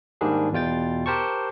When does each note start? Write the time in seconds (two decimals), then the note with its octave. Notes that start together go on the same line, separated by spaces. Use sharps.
0.21 G#2 D#3 G3 A#3 D4 G#4
0.52 E2 B2 F4 G5 A6
1.06 G4 A#4 C5 A5 C#6